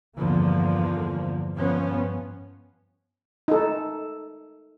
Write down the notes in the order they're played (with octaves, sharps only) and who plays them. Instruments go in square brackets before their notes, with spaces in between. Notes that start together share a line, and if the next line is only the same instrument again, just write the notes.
[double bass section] E2 G2 D3 F3 A#3
G2 F3 B3 C#4
[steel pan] D#4 A4